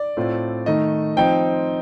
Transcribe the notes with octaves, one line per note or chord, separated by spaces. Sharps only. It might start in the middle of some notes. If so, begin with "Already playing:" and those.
Already playing: D5
A2 A3 C4 F4
D#3 A3 D#4 D#5
F3 C4 D#4 G5